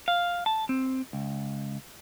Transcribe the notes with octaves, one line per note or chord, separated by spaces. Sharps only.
F5
A5
C4
C#2